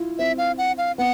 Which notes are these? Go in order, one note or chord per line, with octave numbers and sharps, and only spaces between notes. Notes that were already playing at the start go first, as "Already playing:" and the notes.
Already playing: E4 F4
C4 E5
F5
F#5
F5
B3 F#5